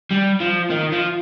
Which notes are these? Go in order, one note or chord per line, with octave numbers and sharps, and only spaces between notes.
G3
F3
D#3
F3